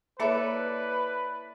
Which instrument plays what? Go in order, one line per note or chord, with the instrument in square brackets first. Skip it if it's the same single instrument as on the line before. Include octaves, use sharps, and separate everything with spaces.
[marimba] A#3 C#5 [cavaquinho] E4 A4 D5 [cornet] B4